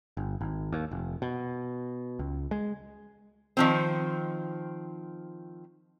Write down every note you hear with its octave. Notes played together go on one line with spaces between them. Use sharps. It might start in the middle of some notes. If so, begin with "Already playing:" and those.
G1
G#1
D#2
F1
B2
C#2
G#3
D#3 F3 C4